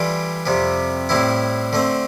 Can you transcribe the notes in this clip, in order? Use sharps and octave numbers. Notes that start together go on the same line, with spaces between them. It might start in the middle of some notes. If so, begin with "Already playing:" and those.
Already playing: E3 G3 D4 F4 A4
F2 C3 G3
A2 G3 C4 E4
D3 A3 C4